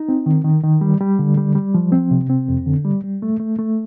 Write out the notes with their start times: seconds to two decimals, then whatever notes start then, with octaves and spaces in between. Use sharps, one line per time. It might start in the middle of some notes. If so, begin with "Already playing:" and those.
Already playing: D#4
0.09 C4
0.26 D#3
0.44 D#3
0.64 D#3
0.81 G3
1.00 G3
1.19 D3
1.37 G3
1.55 G3
1.74 F3
1.92 C4
2.11 C3
2.30 C4
2.48 F2
2.66 D3
2.85 G3
3.04 G3
3.22 A3
3.40 A3
3.59 A3